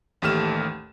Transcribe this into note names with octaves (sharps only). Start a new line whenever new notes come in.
A1 D#2 A3 G4 F6 E7